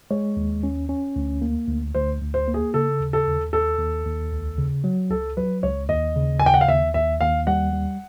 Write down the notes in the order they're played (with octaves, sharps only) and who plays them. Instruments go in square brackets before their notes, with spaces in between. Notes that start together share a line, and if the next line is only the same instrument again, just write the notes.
[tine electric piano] G#3 [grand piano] C#5
[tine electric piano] D#2
C#4
C#4
D2
A#3
D2
[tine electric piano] D2 [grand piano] C5
[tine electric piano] D2
[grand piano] C5
[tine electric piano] A#3
[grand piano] G#4
[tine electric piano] C#3 [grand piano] A4
[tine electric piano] D#2
[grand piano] A4
[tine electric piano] D#2
[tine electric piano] D#2 [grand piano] A4
[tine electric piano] D#2
D#2
C#2
C#3
F#3
[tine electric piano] C#2 [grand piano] A4
[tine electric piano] F#3 [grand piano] B4
[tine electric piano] C#2 [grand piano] C#5
[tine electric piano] D#2 [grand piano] D#5
[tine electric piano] C#3
[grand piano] G#5
[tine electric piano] D#2 [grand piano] G5
[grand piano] F#5
F5
[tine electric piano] D#2 [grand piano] E5
[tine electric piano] D#2 [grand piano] E5
[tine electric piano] D#2 [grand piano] F5
[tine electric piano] G3 [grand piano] F#5
[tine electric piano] G3